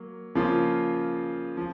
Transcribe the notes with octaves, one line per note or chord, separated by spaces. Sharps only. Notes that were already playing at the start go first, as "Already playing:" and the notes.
Already playing: F#3 A#3
C#3 F3 A#3 F4
F3